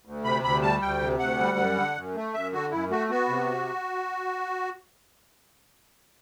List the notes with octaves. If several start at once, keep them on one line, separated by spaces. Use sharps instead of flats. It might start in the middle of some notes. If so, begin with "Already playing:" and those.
D2
C3 B5
D2 B5
G3 A5
D2 G5
C3
D2 F#5
G3
F#2
D3
F#2
A3
F#2 E5
D3 F#4
F#2 E4
A3 F#4
B3 F#4
C3